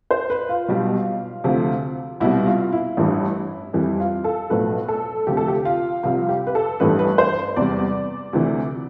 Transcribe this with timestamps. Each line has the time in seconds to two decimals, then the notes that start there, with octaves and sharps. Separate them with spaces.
0.11 C5
0.30 B4
0.49 F4
0.68 B1 B2 G3
1.44 D2 C3 F3
2.20 C2 B2 G3 E4
2.46 F4
2.72 E4
2.97 A1 G2 E3 G3
3.73 F2 E3 G3
4.00 F4
4.24 A4
4.50 B1 A2 F3 B4
4.88 A4
5.27 D2 C3 F3 G4
5.37 A4
5.48 G4
5.65 F4
6.03 C2 C3 F3 F4
6.29 G4
6.47 B4
6.55 A4
6.80 A1 G2 E3 G3 B4
6.99 B4
7.18 C5
7.56 E2 C3 G3 D5
8.33 D2 C3 E3